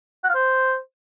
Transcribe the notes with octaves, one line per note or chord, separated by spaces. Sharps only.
F#5
F5
C5